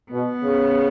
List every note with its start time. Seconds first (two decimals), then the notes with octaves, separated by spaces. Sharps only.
0.11 B2 B3
0.43 C#3